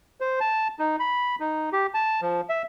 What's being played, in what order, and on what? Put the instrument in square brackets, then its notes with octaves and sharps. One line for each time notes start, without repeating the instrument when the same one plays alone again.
[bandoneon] C5
A5
D#4
B5
D#4
G4
A5
F3
E5